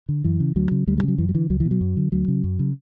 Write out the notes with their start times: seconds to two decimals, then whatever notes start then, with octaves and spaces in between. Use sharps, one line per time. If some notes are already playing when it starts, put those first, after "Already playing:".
0.09 D3
0.24 F#2 E3
0.40 C#3
0.56 D2 F#3
0.71 C#3
0.87 D2 G3
0.98 G3
1.03 C#3
1.08 F#3
1.18 F#2 E3
1.29 F#3
1.34 D3 E3
1.50 C#2 F#3
1.60 E3
1.65 B2
1.71 F#3
1.81 F#2
1.97 D3
2.12 D2 F#3
2.28 C#3
2.44 F#2
2.59 C#3